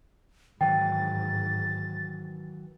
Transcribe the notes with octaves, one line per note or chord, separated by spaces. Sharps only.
G#2 D#3 E3 F#3 G5 A6